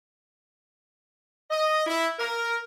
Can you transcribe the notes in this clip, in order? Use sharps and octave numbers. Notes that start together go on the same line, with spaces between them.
D#5
E4
A#4